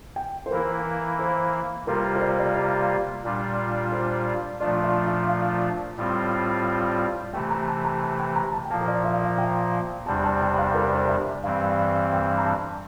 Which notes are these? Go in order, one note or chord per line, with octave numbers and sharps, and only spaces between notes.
G5
C5
E3 A#3 E4 A#4
C5
C3 G3 A#3 F4 A#4
C5
D5
D5
D5
A#2 G3 D4 F4
C5
A#2 F3 A3 D4 F4 D5
E5
E5
F5
A2 G3 C4 F4
C3 E3 A3 G5
A#5
A5
A#5
A5
G5
A#5
A5
G5
A#2 F3 A#3 A5
C5
D5
E5
F5
E5
G5
E2 C3 G3 D4 A5
A5
G5
G5
F5
A#4
C5
E5
G2 E3 G3 C4 F5
G5
A#5
A5